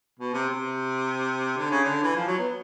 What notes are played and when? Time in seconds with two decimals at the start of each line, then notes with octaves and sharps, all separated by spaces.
0.19 B2
0.34 C3
0.49 C3
1.57 D3
1.70 C#3
1.83 D3
2.03 E3
2.16 F3
2.27 F#3
2.38 B3